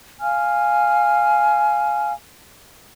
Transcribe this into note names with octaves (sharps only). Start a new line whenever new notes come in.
F5 G#5 F6